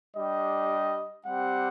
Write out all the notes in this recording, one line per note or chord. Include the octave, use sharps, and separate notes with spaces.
G3 D4 G4 D#5
G3 C4 G4 F#5